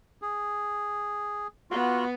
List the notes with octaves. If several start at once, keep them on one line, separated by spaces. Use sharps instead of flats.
G#4
B3 F4 F#4